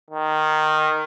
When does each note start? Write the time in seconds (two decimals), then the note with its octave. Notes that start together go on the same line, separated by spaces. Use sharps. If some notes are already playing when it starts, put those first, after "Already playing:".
0.10 D#3